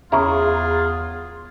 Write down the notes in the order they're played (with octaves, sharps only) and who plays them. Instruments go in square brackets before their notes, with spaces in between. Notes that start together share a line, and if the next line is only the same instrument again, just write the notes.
[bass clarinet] E2 [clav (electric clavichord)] C#3 E4 A#5 [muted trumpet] F4 [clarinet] G#4